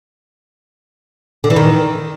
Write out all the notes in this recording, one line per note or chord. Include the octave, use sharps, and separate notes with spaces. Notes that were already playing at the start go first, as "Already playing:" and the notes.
D3
E3
D#3